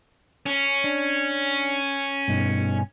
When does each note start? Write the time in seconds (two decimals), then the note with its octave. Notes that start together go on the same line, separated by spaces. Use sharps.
0.46 C#4
0.84 D4
2.28 G2 B2 D#4